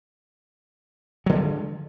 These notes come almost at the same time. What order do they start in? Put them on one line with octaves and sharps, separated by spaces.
F#3 D3 G#3 F3